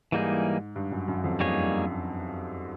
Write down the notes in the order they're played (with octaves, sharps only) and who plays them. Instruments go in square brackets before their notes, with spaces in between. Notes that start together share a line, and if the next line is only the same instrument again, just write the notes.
[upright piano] G#2 [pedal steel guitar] E3 G3 A#3 D#4 G#4
[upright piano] G2
F#2
F#2
F2
[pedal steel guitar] G3 A#3 D#4 G#4 C#5